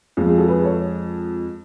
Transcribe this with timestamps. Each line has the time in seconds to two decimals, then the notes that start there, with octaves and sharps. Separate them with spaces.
0.17 F2 F3 G#3 F4 G#4
0.28 F4 G#4
0.38 F#4 A4
0.48 G#4 B4
0.64 A4 C#5